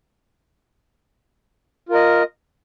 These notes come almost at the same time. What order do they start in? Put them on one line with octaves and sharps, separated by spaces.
F4 A#4 D#5